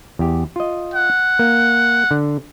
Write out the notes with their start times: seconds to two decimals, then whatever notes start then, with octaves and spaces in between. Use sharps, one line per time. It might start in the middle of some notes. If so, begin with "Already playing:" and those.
0.19 E2 G4
0.56 F4 D#5
0.94 F#5
1.39 A#3
2.11 D3